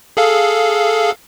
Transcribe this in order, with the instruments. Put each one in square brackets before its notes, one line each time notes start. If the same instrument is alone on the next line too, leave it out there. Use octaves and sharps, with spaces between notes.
[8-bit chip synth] G#4 A4 F5